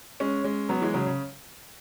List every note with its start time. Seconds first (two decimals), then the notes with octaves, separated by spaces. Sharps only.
0.20 G#3 C#4
0.44 G#3 C#4
0.69 F#3 B3
0.82 E3 G#3
0.94 C#3 F#3
1.07 C#3